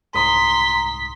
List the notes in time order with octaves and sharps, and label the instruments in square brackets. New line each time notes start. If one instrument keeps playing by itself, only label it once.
[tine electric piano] C2 G#2 D#6 [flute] A#5 [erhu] C6 [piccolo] B6